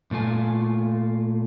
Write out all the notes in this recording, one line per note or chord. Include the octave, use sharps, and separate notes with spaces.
A#2 A3 F4 G#5